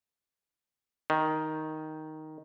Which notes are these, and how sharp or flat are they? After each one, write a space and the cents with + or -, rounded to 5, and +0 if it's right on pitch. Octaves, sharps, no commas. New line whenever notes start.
D#3 +5